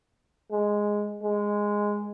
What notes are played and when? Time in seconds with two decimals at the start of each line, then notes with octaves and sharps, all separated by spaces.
0.51 G#3
1.22 G#3